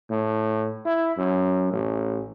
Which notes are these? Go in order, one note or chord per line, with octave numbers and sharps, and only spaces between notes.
A2
E4
F#2
A1